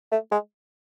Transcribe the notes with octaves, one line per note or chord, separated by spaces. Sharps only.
A3
G#3